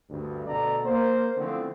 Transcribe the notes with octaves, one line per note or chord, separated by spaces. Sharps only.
D2 G2
D2 B2 F#4 A4 D5 A#5
A#3 C5
D3 E3 F3 A3 B3 C4